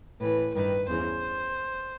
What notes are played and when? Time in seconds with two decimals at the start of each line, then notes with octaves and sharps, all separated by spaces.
0.20 A2 E3 B4
0.55 G2 D#3 B4
0.87 E2 C#3 E3 C5